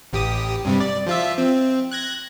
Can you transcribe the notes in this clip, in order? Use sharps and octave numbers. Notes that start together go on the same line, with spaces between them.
A1 G4 D#6
G2 C3 G3
D5
F3 F4 E5
C4
F#6 G#6 A#6